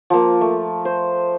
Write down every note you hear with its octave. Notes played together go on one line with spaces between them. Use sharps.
F3 A#3
A3
C5